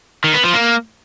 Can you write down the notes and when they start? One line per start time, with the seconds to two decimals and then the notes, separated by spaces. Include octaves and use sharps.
0.24 D#3
0.34 B3
0.44 F3
0.54 A#3